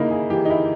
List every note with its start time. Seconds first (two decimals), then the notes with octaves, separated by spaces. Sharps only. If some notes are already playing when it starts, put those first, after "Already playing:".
Already playing: C#3 A#3 D#4 E4
0.11 G#4
0.30 E3 G4
0.45 D#4
0.50 E4